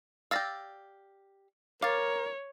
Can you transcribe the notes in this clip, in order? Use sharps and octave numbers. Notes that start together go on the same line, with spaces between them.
G4 D5 F5 E6 A6 A#6
A#4 C#5 F5 D6 A6